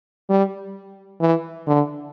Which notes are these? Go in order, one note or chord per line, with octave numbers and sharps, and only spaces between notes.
G3
E3
D3